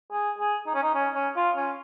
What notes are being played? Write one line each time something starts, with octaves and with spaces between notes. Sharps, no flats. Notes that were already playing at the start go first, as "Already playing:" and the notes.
G#4
G#4
D#4
C#4
D#4
C#4
C#4
F4
C#4